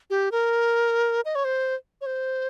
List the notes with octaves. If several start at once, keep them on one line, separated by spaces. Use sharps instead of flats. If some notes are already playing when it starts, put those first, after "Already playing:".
G4
A#4
D#5
C#5
C5
C#5
C5